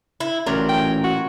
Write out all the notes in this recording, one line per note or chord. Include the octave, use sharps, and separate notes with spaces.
E4
A1 A#2 F#3 A#4
G5
F#4